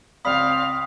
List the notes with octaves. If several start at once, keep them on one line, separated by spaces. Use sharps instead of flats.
C#2 C4 D5 F5 B5 D#6 B6